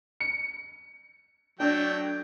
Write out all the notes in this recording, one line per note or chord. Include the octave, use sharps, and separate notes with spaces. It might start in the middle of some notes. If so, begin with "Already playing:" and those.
C#7
F#3 A3 D4 G5